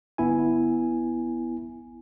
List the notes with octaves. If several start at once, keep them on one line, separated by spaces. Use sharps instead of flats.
G1 B3 E4 G#5